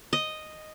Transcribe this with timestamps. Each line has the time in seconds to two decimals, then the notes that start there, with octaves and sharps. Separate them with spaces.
0.13 D#5